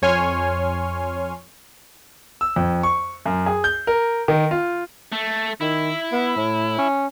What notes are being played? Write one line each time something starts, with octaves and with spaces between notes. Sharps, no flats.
F2 C#5 G#5 C6 F6
E6
F2
C#6
F#2
G#4
G6
A#4
D#3
F4
A3
D#3 E4
B3
A2
C#4